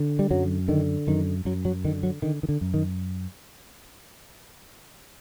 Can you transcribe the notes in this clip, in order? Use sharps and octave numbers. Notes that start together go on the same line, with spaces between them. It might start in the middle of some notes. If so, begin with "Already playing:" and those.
Already playing: D3
G3
F#2 F#3
D3 D#3
F#2 D#3
F#2 F#3
F#3
D3 D#3
F#3
D3 D#3
D#3
D3
F#2
D#3